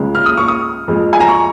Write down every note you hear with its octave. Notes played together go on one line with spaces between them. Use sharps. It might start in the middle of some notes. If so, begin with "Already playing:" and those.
Already playing: C#2 C#3 G#3
F6
D#6
C#6
D#6
F2 F3 G#3
G#5
A#5
C#6